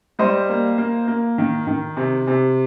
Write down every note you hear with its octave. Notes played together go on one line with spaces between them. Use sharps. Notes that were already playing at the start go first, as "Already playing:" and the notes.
G3 C5 D#5
A#3
A#3
A#3
D#3
D#3
C3
C3